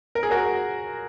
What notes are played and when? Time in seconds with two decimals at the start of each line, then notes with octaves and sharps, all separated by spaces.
0.15 A#4
0.23 G#4
0.31 F#4 A#4